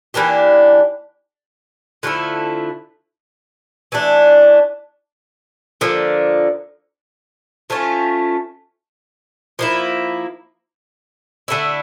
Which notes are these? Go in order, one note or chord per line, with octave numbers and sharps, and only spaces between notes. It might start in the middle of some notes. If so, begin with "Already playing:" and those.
E3 A#3 D4 G4
D3 F3 A3 E4
E3 A3 D4
D3 F3 A#3
F3 A3 C#4 F4
F3 A#3 E4
D3 A3 E4